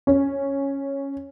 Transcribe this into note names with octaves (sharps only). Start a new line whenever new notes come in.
C#4